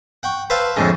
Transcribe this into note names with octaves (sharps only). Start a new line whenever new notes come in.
F#5 G5 C#6
B4 C5 E5 F5 A5 B5
F2 A2 D3 G#3